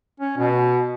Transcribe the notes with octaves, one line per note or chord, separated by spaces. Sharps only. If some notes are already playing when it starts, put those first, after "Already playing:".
C#4
B2